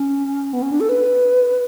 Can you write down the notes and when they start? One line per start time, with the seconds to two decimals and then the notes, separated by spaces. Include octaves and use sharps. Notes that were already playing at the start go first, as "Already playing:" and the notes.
Already playing: C#4
0.53 B3
0.62 C#4
0.71 D4
0.80 A4
0.89 B4